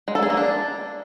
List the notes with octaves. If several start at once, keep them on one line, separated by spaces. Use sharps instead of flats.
G#3
A4
G#4
A#3
D4